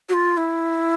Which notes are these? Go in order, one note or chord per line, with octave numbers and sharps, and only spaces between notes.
F#4
F4
E4